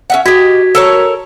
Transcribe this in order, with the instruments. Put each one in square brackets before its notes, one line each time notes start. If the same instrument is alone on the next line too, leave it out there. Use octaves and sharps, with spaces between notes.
[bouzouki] C#4 E5 F#5
[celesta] F#4 G#6 B6 [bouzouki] G4 D#5
[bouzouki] A4 A#4 C#5